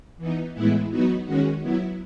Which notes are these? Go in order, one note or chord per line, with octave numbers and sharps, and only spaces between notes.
E3 B3 D#4
A2 E3 G#3 B3 E4
F#3 B3 D#4 F#4
D#3 G#3 C#4 F#4
F#3 B3 E4